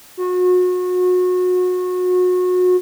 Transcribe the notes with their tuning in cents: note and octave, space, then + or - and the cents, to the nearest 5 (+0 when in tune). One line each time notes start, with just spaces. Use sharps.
F#4 -30